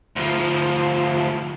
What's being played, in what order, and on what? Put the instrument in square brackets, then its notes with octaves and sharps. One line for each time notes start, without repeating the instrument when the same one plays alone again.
[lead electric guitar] D2 F3